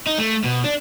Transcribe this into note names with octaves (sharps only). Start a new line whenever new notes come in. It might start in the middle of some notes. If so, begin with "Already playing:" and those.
D#4
A3
B2
D4